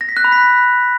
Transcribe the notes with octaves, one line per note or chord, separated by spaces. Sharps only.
A#6
B6
F#6
B5
B6